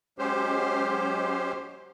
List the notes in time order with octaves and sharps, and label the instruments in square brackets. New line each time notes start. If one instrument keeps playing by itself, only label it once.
[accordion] F#3 G#3 C#4 G4 C5